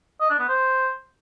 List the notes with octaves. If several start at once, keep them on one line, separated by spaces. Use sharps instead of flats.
D#5
D4
B3
C5